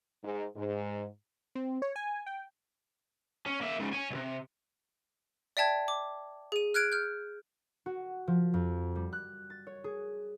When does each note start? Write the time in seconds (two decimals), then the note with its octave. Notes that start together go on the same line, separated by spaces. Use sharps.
0.23 G#2
0.55 G#2
1.55 C4
1.82 C#5
1.96 G#5
2.26 G5
3.46 C#4
3.61 A#3 E5
3.79 G#2 C#3
3.93 C#5 G#5
4.10 C2 C3
5.57 D5 E5 G5 A5 G#6
5.88 D6
6.52 G#4 D#7
6.74 F6 F#6 G#6 D7
6.92 F6 G6
7.86 F#4
8.28 F3
8.54 F2
8.95 G3
9.13 F#6
9.50 A6
9.67 C#5
9.84 G#4